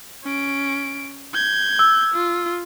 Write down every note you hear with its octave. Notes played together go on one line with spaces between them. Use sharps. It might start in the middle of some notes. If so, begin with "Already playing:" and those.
C#4 D7
G6 G#6
E6
F4